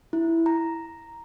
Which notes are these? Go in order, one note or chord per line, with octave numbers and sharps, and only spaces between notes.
E4
A#5